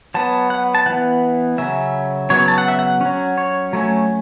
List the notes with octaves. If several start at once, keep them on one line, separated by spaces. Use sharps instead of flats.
F#3 B3 A5
F#5
A5
E3 B3 F#5
C#3 F#3 C#4 E5
C#3 F#3 B3 C#5
A5
F#5
E5
F#5
F#3 C#4
C#5
F#3 A3 C#4